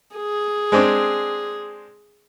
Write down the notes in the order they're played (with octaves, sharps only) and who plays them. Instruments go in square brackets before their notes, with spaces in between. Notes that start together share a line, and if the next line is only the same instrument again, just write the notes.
[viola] G#4
[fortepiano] G#3 C4 D4